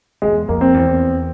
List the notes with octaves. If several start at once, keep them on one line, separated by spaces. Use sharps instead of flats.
E2 G#3
F2 A#3
C4
E2